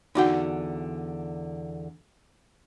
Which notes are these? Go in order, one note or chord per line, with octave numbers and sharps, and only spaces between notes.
E2 D3 D#4 F#4 F#5 G5